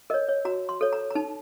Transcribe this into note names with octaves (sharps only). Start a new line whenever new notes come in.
A#4 C#5 D#5
C#5
F#4 A#5
C6
A4 C#5
A#5
A#5
D#4 A5